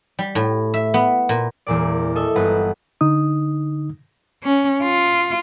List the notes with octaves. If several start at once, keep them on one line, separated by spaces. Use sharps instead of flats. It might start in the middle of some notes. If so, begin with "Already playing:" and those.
G3
A2
E5
B3
A#2
E1 E2 A#2 D5
A4 D#5 E5
G1 B4 F#5
D3 D#4 D#6
C#4
F4